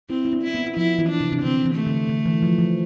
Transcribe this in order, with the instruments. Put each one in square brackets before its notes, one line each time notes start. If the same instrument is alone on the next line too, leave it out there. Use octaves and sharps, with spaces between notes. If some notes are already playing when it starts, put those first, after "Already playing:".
[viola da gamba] C4 [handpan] E4
[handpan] E4
D4
[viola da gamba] E4
[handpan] B3
[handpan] F3 [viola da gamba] E4
[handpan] E3
[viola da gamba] D4
[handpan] C3
C3
[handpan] D3 [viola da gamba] C4
[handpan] E3
[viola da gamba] A3
[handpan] D3
D3
E3
F3
F3